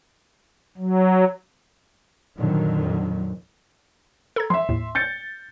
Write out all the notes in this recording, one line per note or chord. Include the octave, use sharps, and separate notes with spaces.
F#3
F2 A#2 D3 D#3 F#3
A4 A#5 G#6
F3 E5 C6
D#2 A2
G6 A6 C#7